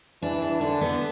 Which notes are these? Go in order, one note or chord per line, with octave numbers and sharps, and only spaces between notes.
E3 D4
D4
D3 D4
B3